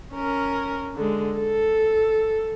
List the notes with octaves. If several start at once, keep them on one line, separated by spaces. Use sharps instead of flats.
C#4 A#4
D3 G#3
A4